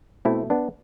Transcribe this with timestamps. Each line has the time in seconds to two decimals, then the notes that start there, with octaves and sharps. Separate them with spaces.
0.25 B2 A3 C4 E4
0.50 B3 D4